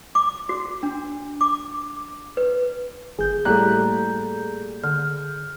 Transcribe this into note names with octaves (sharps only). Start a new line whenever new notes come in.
D6
F#4
D4
D6
B4
G1 G#4 G6
A2 G3 A#3 A4 A#5 F#6
D3 F6